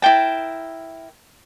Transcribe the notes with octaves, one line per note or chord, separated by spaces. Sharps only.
E4 A#4 G5 A5